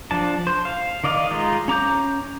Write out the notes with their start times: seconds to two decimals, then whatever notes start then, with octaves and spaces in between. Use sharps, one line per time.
0.11 F3 D4 A5
0.47 C5
0.65 F5
1.04 D#3 D5 D#5 F5
1.30 G#3 D#4 F4
1.68 C#4 A#5 D6 G6